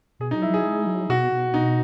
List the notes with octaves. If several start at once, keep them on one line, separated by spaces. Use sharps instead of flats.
B2 G#4
D#4
F#3
E4
F#3 G#4
G#3
F#3
B2 F#4
B2
D#4